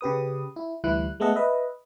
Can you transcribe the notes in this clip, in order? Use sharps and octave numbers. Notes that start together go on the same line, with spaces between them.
C#3 G4 B4 D#6
E4
D2 E3 G3 E4 F#6
G#3 A3 B3 A4 D#5 F#5
B4 D#5 E5